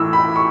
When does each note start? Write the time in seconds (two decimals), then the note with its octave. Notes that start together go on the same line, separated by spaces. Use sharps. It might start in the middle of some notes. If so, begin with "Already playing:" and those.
Already playing: A2 E3 E6
0.13 B5
0.36 C#6